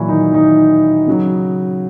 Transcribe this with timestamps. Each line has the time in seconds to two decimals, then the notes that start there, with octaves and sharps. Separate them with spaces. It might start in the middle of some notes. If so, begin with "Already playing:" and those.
Already playing: A#2 E3 F#3 E4 F#4
0.08 D#3 D#4
0.33 D#3 D#4
1.08 C#3 F#3